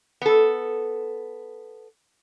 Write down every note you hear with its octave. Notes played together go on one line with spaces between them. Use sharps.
B3 A4